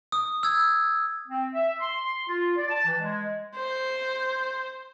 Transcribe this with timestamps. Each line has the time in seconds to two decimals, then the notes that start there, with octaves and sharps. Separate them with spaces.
0.12 D#6
0.43 E6 G#6
1.28 C4
1.54 E5
1.80 C6
2.28 F4
2.57 D5
2.69 A5
2.85 E3
2.99 G#3
3.56 C5